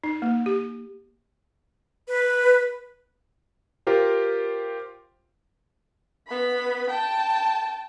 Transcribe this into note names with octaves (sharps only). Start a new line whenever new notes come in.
D#4
A#3
G4
B4
F4 G4 A#4 C5
B3 B5
G5 A5